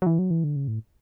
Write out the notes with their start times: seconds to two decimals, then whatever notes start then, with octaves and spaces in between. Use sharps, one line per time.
0.02 F#3
0.06 E3
0.19 F#3
0.31 E3
0.44 D3
0.56 C#3
0.68 A2